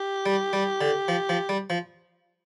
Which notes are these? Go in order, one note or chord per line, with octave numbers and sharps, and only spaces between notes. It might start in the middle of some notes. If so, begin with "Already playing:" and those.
Already playing: G4
G3
G3
D3
F3
F3
G3
F3